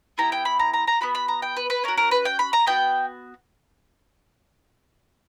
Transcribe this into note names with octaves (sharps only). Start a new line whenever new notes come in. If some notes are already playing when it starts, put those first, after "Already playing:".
B3 E4 G4 A#5
G5
B5
A#5
A#5
A#5
B3 F#4 B5
B5
A#5
G5
B4
B4
C#4 F#4 A#4
A#4
B4
G5
B5
A#5
B3 F#4 G5